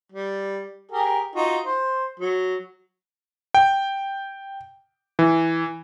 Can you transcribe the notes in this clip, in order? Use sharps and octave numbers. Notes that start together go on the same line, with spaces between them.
G3
G4 G#4 A#4
D#4 F4 F#4
C5
F#3
G5
E3